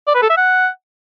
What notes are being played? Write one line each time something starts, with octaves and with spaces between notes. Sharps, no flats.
D5
B4
A4
E5
F#5